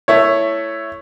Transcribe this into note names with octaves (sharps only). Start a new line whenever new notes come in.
A3 E4 C#5